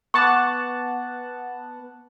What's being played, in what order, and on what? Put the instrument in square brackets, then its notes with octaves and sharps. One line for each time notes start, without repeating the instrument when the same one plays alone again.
[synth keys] B3 F#5 A5 [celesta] C#6 D6